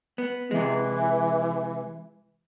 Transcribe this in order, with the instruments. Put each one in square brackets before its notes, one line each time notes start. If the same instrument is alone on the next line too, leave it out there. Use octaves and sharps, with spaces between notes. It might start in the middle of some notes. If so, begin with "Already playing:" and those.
[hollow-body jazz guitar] B3
[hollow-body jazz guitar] C3 G#3 [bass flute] E3